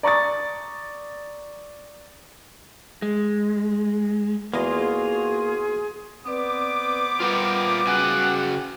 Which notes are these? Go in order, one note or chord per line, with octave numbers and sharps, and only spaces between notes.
D5 A#5 C#6 D#6 A6
G#3
E2 A#3 F4 F#4 G#4 D#5 C6
B3 C4 B4 C5 D5 D6
G3 F4 A#4 B4 F#5
C#3 F#4 F#5 G#5